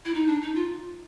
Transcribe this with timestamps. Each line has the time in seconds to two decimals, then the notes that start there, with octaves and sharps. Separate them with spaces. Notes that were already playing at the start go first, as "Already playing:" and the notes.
0.05 E4
0.14 D#4
0.27 D4
0.42 D#4
0.55 F4